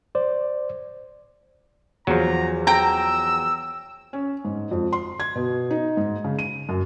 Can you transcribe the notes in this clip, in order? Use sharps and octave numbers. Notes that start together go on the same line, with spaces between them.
C5 D5
E2 F3 F#3 A#5
G5 A#5 E6
C#4
G#2
F2
C6
G#6
B2
D#4
G#2
C#3
D#7
F#2